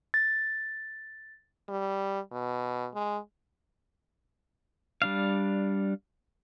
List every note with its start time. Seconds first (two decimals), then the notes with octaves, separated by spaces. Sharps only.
0.14 A6
1.69 G3
2.32 B2
2.94 G#3
5.02 G3 D4 F5